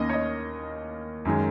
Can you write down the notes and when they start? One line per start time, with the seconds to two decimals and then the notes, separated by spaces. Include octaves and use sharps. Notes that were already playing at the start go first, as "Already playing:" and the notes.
Already playing: D#2 D#3 A#3 C#4 D#5
0.09 C#5
0.13 D#5
1.25 F#2 D#3 G#3 C#4